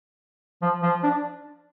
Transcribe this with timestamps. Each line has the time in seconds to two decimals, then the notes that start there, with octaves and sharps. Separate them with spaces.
0.62 F3
0.83 F3
1.03 D4